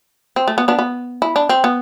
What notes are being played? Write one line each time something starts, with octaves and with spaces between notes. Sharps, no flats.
C4
A3
B3
B3 D4
B3
E4
D4
C4
B3